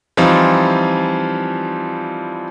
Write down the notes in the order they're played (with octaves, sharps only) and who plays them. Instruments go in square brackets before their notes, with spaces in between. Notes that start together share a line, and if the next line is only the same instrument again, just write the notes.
[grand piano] E3 F3 G3 C4 D#4 F4